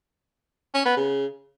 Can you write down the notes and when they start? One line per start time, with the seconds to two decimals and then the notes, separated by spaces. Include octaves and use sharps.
0.74 C#4
0.85 B3
0.97 C#3